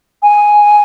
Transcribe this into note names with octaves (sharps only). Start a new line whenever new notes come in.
G#5